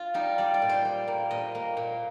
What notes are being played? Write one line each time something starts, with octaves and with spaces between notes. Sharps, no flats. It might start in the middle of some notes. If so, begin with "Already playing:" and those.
Already playing: F4
G3 D#4
G3 D5
D5
A#2
C5
G3
A#3
A#2 D#5
A#3
A#2